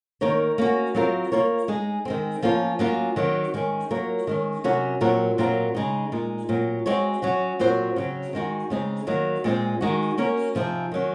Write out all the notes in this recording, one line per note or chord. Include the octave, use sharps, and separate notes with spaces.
D#3 A#3 D#4 A#4 C#5
A#3 C#4 F#4
F#3 C4 F4 A#4
A#3 F4 A#4 C#5
G#3 D#4 G#4
D#3 G#3 C4
F3 A#3 C#4 F4
F#3 A#3 C#4 F4
D#3 F#3 C4
D#3 G#3 C#4
F#3 A#3 F4 A#4 C#5
D#3 G#3 C#4
C3 F#3 C#4 F#4 A#4
A#2 F#3 C4 F#4 A#4
A#2 F#3 C4 F4 A#4
C#3 G#3 D#4
A#2 G#3 D#4
A#2 F#3 C4
G#3 C4 F#4 C#5
F#3 C#4 F#4
A#2 F#3 C4 F#4 C5
C#3 F#3 C4
D#3 G#3 D#4 F#4
C#3 G#3 C4 D#4 G#4
D#3 F#3 A#3
A#2 G#3 C4
D#3 G#3 D#4 F#4
A#3 C#4 F#4 A#4 C#5
C3 F3 C4 D#4 G#4
D#3 F#3 C#4